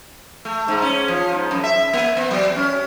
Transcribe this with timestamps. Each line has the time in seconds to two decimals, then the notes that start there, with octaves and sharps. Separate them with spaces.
0.45 A3
0.68 G#2
0.82 C#4
1.08 F3
1.32 G#2
1.51 F#2
1.64 E5
1.93 A#3
2.17 B3
2.31 F#3
2.56 C#4